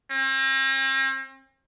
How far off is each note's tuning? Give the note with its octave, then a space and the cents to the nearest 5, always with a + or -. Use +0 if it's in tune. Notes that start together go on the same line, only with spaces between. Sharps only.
C4 +45